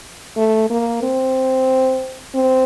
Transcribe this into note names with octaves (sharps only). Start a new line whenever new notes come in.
A3
A#3
C4
C4